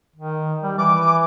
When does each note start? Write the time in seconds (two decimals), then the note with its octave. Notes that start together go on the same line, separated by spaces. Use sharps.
0.16 D#3
0.63 G3
0.78 E3 D6